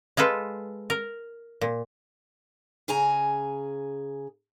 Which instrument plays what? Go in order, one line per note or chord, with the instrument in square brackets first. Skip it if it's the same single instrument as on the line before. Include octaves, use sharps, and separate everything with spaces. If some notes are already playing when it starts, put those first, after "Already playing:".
[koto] G#3 F4 A4 B4
A#4
A#2
[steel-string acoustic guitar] C#3 G#4 G#5 A#5